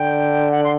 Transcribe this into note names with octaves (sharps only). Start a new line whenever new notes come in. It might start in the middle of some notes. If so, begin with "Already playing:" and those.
Already playing: D3 G5
F#5
C6